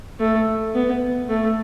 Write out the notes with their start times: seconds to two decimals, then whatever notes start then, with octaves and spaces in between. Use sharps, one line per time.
0.20 A3
0.75 B3
1.29 A3